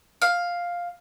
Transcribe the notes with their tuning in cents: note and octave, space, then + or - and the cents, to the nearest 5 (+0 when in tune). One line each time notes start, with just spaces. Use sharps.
F5 +5